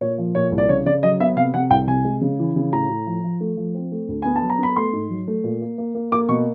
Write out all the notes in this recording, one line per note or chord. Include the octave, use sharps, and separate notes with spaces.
A#2 C#5
F3
A#2 C#5
C2
D5
C#3 C#5
C#3 D5
F#3 D#5
B3 E5
C3 F5
C3 F#5
C2 G5
C3 G#5
G#3
C#3
E3
C#3
A2 A#5
A2
F3
F3
A3
F3
C4
A3
D2
B3 G#5
A5
F#3
A#5
B3 B5
A3 C6
G#2
F#3
A3
A#2
A#3
A#3
A#3
A#3 D6
B2 C#6